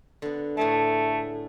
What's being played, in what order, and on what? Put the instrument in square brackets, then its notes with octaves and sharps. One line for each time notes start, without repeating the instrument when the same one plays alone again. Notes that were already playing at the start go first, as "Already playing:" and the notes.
[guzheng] D3 B3
[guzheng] A2 G#4 A5 [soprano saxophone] A3